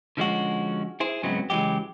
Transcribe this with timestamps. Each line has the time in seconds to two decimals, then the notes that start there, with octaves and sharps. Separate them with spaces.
0.17 D3 F3 G#3 C#4 F#4
1.00 E4 G#4 C5
1.23 G#2 C#3 F#3 G#3 B3 C4
1.50 C#2 E3 F#3 G#3 G4